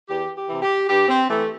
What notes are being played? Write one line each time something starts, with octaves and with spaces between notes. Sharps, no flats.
E2 G4
G4
C3 E3
G4
G2 G4
C4
E3 A3